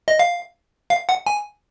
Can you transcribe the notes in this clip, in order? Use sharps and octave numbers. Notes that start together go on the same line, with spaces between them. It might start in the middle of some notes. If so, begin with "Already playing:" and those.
D#5
F5
F5
F#5
G#5